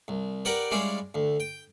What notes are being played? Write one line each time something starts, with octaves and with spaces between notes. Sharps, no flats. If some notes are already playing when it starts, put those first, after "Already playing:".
C2
G4 A#4 B4 D5 F#5 G5
G3 G#3 C#4 E4 D5 F5
D2
G5